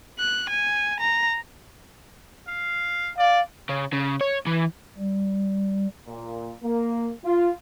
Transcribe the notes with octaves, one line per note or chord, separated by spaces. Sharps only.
F#6
G#5
A#5
F5
D5 F5
C#3
C#3
C#5
E3
G3
A#2
A#3
F4